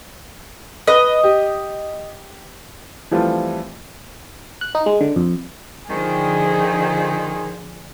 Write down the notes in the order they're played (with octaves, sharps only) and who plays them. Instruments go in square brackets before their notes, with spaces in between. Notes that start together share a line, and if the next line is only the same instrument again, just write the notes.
[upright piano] B4 [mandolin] D#5
[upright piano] G4
[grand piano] E3 F3 G3 A3 C4 F4
[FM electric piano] F#6
D#4
G#3
D3
F2
[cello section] D3 F3 [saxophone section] D#3 C5 [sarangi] G#4